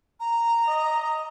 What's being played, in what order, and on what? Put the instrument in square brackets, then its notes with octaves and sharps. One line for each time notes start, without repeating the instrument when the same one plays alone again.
[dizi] A#5
[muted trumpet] D#5